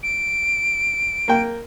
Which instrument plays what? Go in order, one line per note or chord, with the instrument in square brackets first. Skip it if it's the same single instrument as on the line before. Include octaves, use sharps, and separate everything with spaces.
[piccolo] D7
[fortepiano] A#3 G5